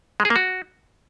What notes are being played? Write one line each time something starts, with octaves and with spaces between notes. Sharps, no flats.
G#3
G#4
A#3
F#4